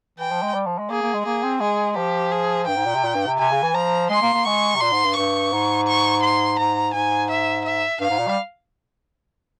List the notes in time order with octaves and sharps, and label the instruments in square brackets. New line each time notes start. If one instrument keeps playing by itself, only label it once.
[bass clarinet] E3 [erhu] G5
[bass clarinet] F3
G#3
G3
F3
G#3
[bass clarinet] A#3 [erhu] G#4
[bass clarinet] A#3
G#3
[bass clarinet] A#3 [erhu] G#4
[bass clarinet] C4
[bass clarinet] G#3 [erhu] G#4
[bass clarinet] F3 [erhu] G4
[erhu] G#4
[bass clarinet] G2 [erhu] G5
[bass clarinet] G#2
A#2
C3
A#2
G2
C3
[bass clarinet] C3 [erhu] G#5
[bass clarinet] C#3
E3
[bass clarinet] F3 [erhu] A#5
[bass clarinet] G#3 [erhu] C6
[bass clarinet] A#3
A#3
[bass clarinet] G#3 [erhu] C#6
[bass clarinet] C3
[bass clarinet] A#2 [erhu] C6
[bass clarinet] G#2
G2
[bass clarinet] G2 [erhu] C#6
[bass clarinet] G#2
[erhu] C#6
C6
[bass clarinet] G#2 [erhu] A#5
[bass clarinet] G#2 [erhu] G#5
[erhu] E5
E5
[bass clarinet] G2 [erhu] F5
[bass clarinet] G#2
A#2
G3